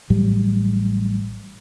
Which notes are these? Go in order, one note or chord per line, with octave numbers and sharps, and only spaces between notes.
A1 A2 F#3 G3